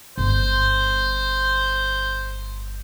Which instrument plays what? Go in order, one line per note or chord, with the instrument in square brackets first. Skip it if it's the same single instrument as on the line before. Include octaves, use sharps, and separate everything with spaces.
[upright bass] G1 [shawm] C5